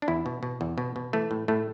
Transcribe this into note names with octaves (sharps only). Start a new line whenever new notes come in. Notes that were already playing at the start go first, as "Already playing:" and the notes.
D4
E2 E4
B2
B2
E2
B2
B2
E3 A3
A2
A2 A3